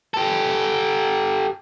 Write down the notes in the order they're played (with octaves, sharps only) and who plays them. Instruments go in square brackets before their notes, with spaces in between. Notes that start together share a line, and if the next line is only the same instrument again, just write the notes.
[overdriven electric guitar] G4 A4